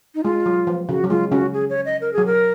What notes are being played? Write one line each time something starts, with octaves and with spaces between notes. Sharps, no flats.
D#4
G#3 F4
F#3
F3
C#3 F#4
F#3
G#3 F4
C#3 C#4 F#4
G#4
C#5
D#5
A#4
F#3 G#4
A#4